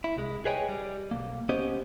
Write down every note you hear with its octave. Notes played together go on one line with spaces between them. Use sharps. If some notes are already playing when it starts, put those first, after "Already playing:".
E4
C2 G#3
G#4 B4 C#5 D#5 G5 G#5
G3
B1 A#3
C#2 B3 C#4 G4 C5 D#5